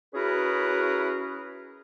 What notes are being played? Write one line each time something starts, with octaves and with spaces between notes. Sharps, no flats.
C#4 E4 F#4 G#4 A#4 B4